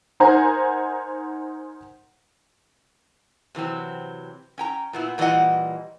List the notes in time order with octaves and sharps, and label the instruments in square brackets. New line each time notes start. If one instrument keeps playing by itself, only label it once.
[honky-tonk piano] D#4 A#4 C5 F#5 G#5 A#5
[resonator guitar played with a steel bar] C3 E3 F#3 C4
C#4 G5 A#5
A#2 B3 E4
A#2 E3 G3 B3 D#5 F#5